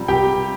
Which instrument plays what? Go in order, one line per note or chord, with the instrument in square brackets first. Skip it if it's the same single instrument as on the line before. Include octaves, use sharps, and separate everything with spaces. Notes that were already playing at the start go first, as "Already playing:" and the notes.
Already playing: [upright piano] C3 G3 F4
[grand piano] G4 G5